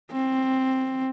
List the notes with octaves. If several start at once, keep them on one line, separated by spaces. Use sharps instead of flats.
C4